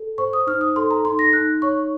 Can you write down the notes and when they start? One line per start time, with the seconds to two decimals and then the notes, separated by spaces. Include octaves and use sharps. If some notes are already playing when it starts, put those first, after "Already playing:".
Already playing: A4
0.18 C5 C#6
0.33 D#6
0.47 D#4 F6
0.61 D#6
0.76 A4 C6
0.91 A#5
1.05 D#4 C6
1.19 A#6
1.33 D#4 F#6
1.62 C#5 C#6